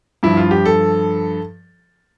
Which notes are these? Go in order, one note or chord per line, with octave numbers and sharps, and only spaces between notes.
G2 F3 E4
F4
G4
A4